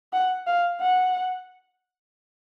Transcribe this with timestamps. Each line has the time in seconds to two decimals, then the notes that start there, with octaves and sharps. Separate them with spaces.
0.13 F#5
0.47 F5
0.80 F#5